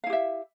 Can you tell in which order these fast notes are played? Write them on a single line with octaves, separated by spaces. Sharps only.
F5 E4 G4 E5